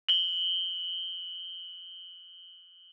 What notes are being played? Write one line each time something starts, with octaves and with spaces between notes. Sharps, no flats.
F#7 G7